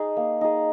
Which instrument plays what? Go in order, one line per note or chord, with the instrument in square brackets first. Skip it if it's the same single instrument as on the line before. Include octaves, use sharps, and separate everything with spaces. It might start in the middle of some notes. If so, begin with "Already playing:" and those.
Already playing: [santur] D#4 G#4
A#3
D#4 G#4